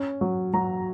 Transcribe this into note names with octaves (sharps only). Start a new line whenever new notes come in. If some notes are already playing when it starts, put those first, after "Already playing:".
Already playing: C#4
F#3
F#3 A#5